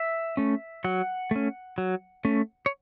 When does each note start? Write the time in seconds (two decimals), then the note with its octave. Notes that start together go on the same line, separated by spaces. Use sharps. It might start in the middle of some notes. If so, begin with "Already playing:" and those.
Already playing: E5
0.37 A3 C#4
0.84 F#3 F#5
1.31 A3 C#4
1.78 F#3
2.25 A3 C#4
2.66 C#5